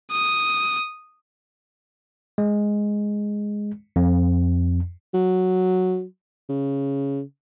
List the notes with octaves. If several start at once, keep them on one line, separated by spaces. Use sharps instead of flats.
D#6
G#3
F2
F#3
C#3